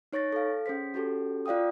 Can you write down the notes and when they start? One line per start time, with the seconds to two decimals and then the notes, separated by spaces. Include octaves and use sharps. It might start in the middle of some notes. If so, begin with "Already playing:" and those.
0.13 D#4 C#5 C#6 A6 A#6
0.32 A4 F5
0.66 C#4 G#4 C5 B6
0.94 C#4 F#4 G4 A4
1.46 F4 D5 F5 G5 D#6